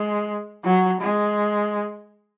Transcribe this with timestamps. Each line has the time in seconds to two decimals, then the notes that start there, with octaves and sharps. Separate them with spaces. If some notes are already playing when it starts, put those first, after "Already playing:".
Already playing: G#3
0.64 F#3
1.01 G#3